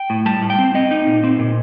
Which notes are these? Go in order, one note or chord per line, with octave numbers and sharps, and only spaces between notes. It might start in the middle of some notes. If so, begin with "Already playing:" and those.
Already playing: G5
A2
G3 A5
A2
G5
C4
C4 D#5
D#4
A#2
C4
A#2